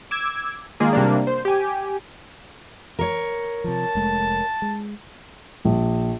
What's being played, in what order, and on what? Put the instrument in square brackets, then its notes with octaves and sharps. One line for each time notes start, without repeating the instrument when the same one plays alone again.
[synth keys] D6 E6 G#6
D#3 G#3 A#3 F4 G#4
C3 G3 A#3 D4
C5
G4 G#5
[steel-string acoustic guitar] A#4 C#5
[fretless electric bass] C3 F3 [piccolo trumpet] A5
[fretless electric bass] F1 G#3 A3
G#3
[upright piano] A#1